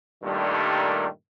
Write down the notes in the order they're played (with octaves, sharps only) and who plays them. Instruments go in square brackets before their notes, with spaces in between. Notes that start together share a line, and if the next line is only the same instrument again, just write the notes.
[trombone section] G2 A#2 D#3 G3 A3